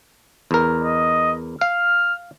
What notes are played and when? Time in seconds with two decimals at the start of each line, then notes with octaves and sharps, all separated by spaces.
0.51 E2 A#4
0.83 D#5
1.61 F5 F6